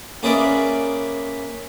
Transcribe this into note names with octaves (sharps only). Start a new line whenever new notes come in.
A#3 C#4 G#4 B4 D5 E5